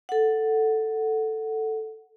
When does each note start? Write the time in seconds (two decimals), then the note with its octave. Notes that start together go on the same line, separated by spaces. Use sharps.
0.09 A4 F#5